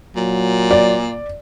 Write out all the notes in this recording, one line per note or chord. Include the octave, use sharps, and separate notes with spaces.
A#2 F#3
D5